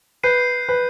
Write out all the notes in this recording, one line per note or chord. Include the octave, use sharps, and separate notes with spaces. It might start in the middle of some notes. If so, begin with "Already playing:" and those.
B4 G6 C7 D#7
B4